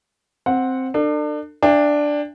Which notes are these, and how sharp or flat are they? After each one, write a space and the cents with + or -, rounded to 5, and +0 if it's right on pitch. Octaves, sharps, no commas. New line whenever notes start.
C4 +0 F#5 -10
D4 +30 A4 +40
D4 +0 E5 +35 G5 +40